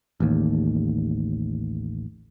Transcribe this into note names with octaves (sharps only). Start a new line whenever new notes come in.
A1 D#2